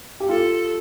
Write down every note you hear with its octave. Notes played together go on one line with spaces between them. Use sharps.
G4
F4 A4